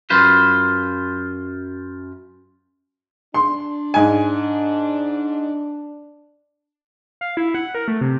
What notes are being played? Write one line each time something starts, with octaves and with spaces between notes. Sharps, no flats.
F#2 F4 B4 C5
D4 C6
G#2 G#5
F5
E4
F#5
A#4
A3
C3